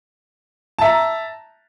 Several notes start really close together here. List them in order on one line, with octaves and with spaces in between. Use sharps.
A5 E5 A#5